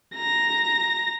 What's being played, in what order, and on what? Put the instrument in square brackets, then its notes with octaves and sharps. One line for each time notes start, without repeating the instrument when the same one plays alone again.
[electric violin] A#5 A#6